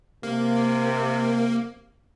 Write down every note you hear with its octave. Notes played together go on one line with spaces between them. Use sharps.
C3 A#3